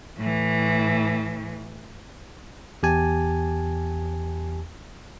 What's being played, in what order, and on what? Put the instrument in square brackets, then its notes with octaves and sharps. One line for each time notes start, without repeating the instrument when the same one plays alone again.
[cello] A2 E3
[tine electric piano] E2 G4 G#5 A5